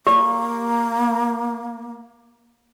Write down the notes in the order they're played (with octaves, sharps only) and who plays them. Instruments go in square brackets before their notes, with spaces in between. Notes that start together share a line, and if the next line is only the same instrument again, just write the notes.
[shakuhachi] A#3 [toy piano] G4